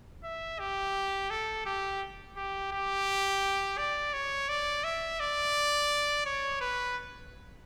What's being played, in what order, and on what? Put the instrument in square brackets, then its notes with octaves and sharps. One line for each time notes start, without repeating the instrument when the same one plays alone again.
[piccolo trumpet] E5
G4
A4
G4
G4
G4
D5
C#5
D5
E5
D5
C#5
B4